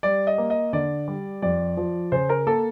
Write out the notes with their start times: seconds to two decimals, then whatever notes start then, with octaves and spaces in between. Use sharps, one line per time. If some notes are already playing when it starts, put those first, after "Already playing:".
0.03 G3 D5
0.27 D#5
0.38 A#3
0.50 D#5
0.73 D3 D5
1.08 G3
1.42 F2 D5
1.77 F3
2.12 C#3 C5
2.29 A#4
2.47 A#3 A4